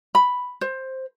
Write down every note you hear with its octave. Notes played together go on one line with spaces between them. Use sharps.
B5
C5